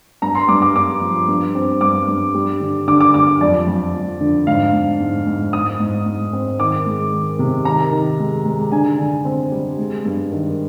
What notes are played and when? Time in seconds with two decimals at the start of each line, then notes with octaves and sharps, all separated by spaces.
0.22 G2 A#5
0.35 C6
0.48 G2 D6
0.62 D6
0.75 G2 D6
1.01 F3
1.28 G2
1.55 C4
1.81 G2 D6
2.08 G2
2.34 G3
2.61 D3
2.87 D3 D6
3.00 D6
3.14 G3 D6
3.41 F2 D5
3.67 F2
3.94 F2
4.21 D3
4.47 G#2 F5
4.73 G#2
5.00 G#2
5.26 G#2
5.53 G#2 D#6
5.80 G#2
6.06 G#2
6.33 C4
6.60 D#3 D6
6.86 G#3
7.13 D#3
7.39 C3
7.65 D#3 A#5
7.92 D#3
8.19 G#3
8.45 G#3
8.72 D3 G#5
8.99 D3
9.25 C4
9.52 G3
9.78 G#3
10.05 G2
10.31 D#3